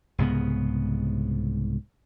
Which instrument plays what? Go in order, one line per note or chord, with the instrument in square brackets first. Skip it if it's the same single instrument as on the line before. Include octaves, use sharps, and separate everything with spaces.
[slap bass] C2 G#2 C#3 B3